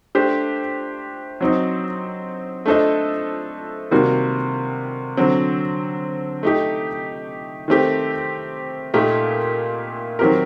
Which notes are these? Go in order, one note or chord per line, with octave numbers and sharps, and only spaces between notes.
A3 D4 G4 C5
F#3 C4 D#4
A3 D4 A4 C5 D#5
C3 D#3 G3 A#3 F#4
D3 F#3 C4
A3 D#4 G4
D#3 A3 C4 G4
A#2 A3 D#4 G4 A#4
D#3 F#3 C4 G4 A#4